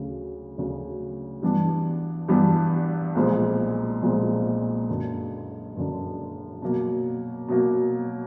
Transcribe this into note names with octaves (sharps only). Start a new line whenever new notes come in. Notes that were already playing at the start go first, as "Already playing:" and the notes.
Already playing: D2 C#3 F#3
D2 C#3 F#3
G2 E3 G3 B3 D4
G2 E3 G3 B3 D4
B1 A#2 F3 G#3 C4
B1 A#2 F3 G#3 C4
F#1 F#2 D3
F#1 F#2 D3
B2 F#3 A#3
B2 F#3 A#3